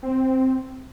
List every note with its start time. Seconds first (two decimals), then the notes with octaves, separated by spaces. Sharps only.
0.03 C4